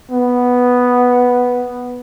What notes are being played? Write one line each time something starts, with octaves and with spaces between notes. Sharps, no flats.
B3